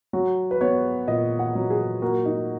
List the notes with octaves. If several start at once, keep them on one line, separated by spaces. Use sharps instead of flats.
F#3 F#4
B4
B3 C#5
A#2 D#5
F#5
F#3
G#4
A#3 F#4
D#4